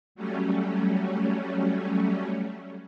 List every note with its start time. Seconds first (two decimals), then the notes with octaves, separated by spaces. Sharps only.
0.15 F#3 G3 A3 C#4